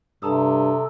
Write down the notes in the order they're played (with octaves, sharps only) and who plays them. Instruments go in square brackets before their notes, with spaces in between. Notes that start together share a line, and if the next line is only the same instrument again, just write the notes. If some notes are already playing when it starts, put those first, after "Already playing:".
[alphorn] G2 [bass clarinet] C3 [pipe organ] A4 [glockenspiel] A5 A#5 D#6